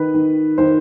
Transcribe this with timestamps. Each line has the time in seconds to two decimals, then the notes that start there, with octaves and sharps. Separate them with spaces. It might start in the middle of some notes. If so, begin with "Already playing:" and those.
Already playing: D#3 B4
0.14 D#3
0.58 D#3 C5